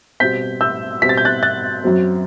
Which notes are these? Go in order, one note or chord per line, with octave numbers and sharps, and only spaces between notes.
B2 G3 C4 G6 B6
E6 G6
B2 G3 C4 B6
A6
G6
F#6 A6
F#6 A6
F#2 F#3 C4